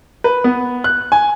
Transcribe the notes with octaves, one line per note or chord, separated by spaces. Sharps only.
B4
B3
F#6
G#5